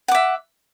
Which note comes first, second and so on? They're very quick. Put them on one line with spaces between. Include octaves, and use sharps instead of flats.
F#5 D6 E5